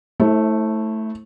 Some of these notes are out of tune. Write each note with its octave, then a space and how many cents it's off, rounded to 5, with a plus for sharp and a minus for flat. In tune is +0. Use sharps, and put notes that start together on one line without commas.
A3 +0 E4 -30 C5 +40